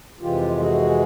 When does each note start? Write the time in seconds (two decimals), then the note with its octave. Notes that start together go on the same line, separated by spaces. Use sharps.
0.21 F2 C3 E3 G#3 F4 G4
0.59 F#4 G#4